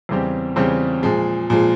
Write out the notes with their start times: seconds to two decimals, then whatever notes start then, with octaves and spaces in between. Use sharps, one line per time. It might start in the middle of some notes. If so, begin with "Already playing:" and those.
0.09 E2 C#3 G3 C4 G4
0.56 E2 C#3 G3 C4 G4
1.03 A#2 F3 G#3
1.50 A#2 F3 G#3